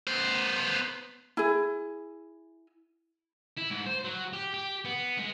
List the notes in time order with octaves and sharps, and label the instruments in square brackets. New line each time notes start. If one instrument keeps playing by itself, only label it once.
[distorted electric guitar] B3 C5
[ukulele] E4 G#4
[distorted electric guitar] E4
G#2
C5
F#3
G4
G4
B3
G#3